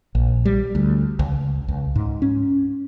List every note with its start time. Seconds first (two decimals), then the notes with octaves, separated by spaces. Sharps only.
0.15 A#1
0.45 G3
0.75 D2
1.19 C#2
1.68 C#2
1.96 G#2
2.22 C#4